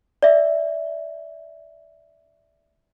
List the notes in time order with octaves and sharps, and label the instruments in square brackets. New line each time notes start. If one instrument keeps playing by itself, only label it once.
[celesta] D5 E5